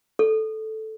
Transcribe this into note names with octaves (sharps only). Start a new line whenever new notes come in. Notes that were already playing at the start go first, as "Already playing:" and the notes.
A4